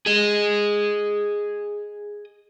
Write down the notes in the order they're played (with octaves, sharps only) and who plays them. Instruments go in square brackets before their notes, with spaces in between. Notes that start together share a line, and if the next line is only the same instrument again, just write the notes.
[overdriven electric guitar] G#4 D#5